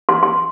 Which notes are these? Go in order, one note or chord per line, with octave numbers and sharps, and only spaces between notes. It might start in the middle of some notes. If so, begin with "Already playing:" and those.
C6
C6